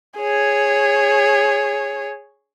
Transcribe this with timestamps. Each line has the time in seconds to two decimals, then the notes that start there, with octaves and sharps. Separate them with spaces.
0.18 G#4 C#5